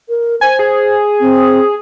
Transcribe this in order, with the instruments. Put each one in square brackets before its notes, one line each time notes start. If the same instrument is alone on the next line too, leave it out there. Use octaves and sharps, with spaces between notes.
[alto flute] A#4
[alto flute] C5 [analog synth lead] G#5
[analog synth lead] G#4
[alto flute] C4